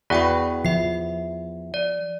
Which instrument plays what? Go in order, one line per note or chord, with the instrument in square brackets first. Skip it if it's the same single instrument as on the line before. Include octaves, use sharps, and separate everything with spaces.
[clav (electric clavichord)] E2 F#4 B4 [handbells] D5 G5 C#6
[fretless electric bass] F3 [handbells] E5 C7
[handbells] D5